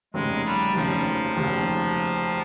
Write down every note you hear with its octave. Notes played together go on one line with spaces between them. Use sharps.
F1 D#2 C#3 G#3
G3
F1 D#2 C#3 F3
F1 D#2 C#3